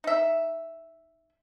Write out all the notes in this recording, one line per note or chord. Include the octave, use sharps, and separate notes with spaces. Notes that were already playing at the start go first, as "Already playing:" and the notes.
D#4 E5